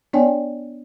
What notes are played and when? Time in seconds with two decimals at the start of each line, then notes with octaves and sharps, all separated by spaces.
0.13 B3 D4 C#5 D5 G5 G#5